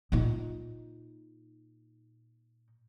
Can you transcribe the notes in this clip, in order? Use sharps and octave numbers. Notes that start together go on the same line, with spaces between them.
A#2 D#4